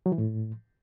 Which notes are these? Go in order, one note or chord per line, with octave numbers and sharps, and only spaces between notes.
F#3
E3
A2